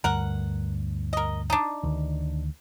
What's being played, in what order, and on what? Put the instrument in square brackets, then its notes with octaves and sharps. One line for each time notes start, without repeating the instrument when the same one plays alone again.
[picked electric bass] D2 G2 [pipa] A#4 F#5
[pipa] A#4 D#5
D4 D#4
[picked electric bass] D2 D#3